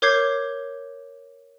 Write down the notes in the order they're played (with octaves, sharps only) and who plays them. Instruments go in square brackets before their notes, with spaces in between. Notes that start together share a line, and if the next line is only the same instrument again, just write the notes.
[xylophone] A#4 C#5 D6 G6 G#6 C7